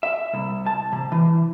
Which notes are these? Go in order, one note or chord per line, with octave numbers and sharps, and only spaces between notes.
E5
C2
A5
C3
E3